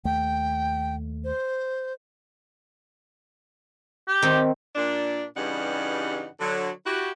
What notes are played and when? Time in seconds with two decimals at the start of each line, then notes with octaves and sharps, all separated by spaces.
0.05 D#2 A3 G5
1.24 C5
4.08 G4
4.22 D#3 C4
4.75 A#2 D4
5.36 G2 C#3 E3 G3 D#4 F#5
6.40 D3 F#3
6.85 E4 F#4 G4